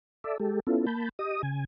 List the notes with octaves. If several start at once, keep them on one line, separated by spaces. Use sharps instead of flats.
A4 D5 E5
G#3 G4 A4
B3 C#4 E4 F4 A4
A#3 A5 B5 G6
G4 D#5 D#6
C#3 G#5